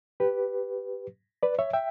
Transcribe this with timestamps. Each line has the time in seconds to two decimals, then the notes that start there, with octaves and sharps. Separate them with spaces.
0.20 G4 B4
1.43 B4 D5
1.59 C#5 E5
1.73 E5 G5